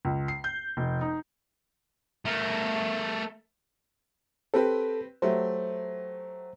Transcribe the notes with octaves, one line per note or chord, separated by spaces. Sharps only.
C#2
C7
G6
F1
D#4
A3 A#4
C4 G4 A4 B4
F#3 A3 G4 C5